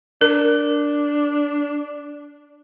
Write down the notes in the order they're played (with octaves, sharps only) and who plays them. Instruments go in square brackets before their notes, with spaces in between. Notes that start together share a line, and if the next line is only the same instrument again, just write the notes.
[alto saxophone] D4 [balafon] A#4